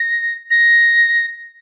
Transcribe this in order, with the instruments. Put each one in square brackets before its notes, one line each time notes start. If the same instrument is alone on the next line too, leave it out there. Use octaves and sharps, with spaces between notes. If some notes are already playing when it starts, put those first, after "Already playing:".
Already playing: [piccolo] A#6
A#6